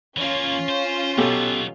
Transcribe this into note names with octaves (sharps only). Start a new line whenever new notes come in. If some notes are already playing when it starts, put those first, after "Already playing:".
E3 A#3 C#4 F4
C5
B2 F#3 B3 G4 A4